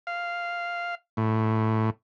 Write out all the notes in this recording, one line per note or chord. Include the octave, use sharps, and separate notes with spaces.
F5
A2